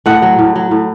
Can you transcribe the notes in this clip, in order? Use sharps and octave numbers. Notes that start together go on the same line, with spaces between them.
A2 F#5
F#3
A2
F#3
A2